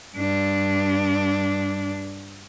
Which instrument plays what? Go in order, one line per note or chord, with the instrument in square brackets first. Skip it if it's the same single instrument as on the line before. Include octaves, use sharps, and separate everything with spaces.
[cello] G2 D4